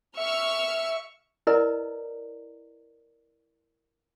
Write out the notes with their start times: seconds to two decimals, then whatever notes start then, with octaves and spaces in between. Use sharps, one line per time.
0.17 E5 C#6 E6 F6
1.47 E4 A#4 B4 D5 D#5 A#5